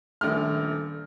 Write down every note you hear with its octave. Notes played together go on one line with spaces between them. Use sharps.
D#1 A#1 A3 F6